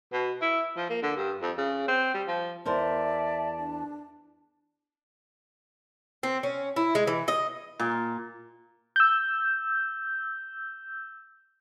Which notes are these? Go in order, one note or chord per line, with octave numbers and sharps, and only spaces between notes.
B2
E4
F3
A#3
D3
G2
F2
C#3
C4
G3
F3
E2 A#4 C5 D5 E5 A5
D4
C4
C#4
E4
G#3
E3
D#5
A#2
E6 G6